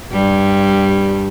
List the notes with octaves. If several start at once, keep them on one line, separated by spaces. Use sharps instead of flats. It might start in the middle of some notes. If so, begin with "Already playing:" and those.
G2 G3